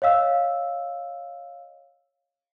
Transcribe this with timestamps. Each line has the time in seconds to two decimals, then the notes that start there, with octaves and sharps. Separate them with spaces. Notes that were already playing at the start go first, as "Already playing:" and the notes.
0.02 C#5 D#5 F5 E6